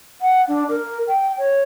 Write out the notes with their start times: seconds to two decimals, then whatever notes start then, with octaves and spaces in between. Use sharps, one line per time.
0.22 F#5
0.48 D4
0.69 A#4
1.08 G5
1.38 C#5